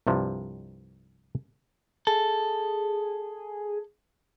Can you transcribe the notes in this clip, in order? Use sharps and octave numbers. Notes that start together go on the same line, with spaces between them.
C2 G2 C3 F3
G#4 A4